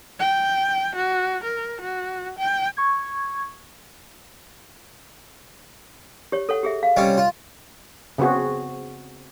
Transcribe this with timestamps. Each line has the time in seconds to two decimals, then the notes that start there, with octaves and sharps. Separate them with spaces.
0.20 G5
0.95 F#4
1.44 A#4
1.81 F#4
2.38 G5
2.77 C#6 G#6
6.32 G4 C#5
6.49 A4 C#5 F#5
6.63 G4 G#4 E5
6.83 F5
6.97 C3 G3 C#4 D#5
7.18 F4
8.18 C#3 B3 C4 F#4 G#4